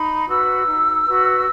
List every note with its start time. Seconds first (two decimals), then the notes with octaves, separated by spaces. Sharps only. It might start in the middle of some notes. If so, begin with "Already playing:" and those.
Already playing: D#4 B5
0.27 F#4 B4 E6
0.67 D#4
1.06 F#4 B4